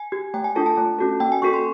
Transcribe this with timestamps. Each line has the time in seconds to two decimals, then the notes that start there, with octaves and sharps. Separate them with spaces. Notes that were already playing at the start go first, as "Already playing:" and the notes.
Already playing: G#5
0.12 G4
0.34 A3 G5
0.44 G#5
0.55 D4 F4 A4 A5
0.66 A5
0.77 A3
0.99 C#4 F#4 A4
1.20 A#3 G5
1.32 G#5
1.42 C#4 F#4 A4 C#6
1.54 C6